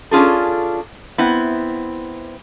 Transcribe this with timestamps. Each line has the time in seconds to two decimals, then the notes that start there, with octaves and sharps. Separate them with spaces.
0.11 C#4 D4 F4 G#4 A4
1.18 B3 C4 E4